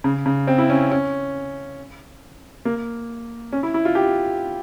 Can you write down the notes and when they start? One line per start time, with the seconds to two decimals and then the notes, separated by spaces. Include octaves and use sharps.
0.04 C#3
0.26 C#3
0.47 C4
0.58 E4
0.70 C#4
0.91 C#4
2.65 A#3
3.52 C#4
3.63 E4
3.74 E4
3.85 F4
3.95 G4